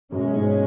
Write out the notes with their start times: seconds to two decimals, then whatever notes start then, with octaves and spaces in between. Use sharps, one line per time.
0.12 F#2 B2 G#3 C#4
0.35 G#2